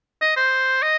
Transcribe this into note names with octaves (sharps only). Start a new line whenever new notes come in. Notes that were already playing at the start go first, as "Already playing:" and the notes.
D#5
C5
D#5